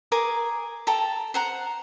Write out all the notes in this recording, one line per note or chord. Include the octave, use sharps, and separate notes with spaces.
G#4 A#4 G#5 D6
A4 G5 A5 A#5
C5 F#5 A#5